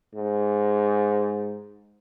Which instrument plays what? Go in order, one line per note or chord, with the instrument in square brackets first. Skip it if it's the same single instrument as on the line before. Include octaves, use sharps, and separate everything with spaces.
[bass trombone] G#2